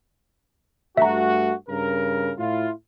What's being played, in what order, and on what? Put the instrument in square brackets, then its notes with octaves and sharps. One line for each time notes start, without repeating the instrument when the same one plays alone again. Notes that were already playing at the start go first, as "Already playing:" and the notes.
[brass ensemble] G2 A3 F#4 [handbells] E5 A#5
[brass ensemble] G2 C#3 A#4
A2 E4 F4